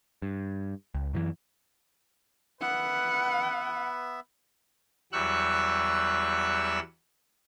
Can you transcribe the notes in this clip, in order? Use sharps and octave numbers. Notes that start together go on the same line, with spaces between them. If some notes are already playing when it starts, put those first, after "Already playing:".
G2
C#2
F#2 D#3 E3
B3 B4 E5 F#5
E2 F#3 G3 C#6 E6 F#6